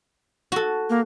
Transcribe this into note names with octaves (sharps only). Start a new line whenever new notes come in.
F#4 A4
A#3